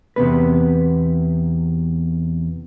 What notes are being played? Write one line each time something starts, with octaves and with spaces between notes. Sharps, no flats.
E2 C3 B3 B4